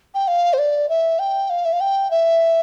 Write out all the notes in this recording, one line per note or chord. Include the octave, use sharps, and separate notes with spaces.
G5
F5
C5
D5
E5
G5
F5
E5
F5
G5
E5